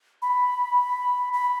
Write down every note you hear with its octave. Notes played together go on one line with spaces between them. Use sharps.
B5
B5